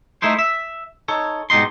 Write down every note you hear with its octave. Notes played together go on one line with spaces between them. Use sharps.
A3 D#4 E4 C5
E5
D#4 A4 C#5
G#2 B2 G3 D#4 C6